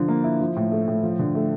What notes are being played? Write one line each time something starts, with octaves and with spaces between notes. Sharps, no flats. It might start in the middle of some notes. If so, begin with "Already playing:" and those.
Already playing: D3 F3
A#3
E4
F3
A2
A3
A2
F3
D3
A3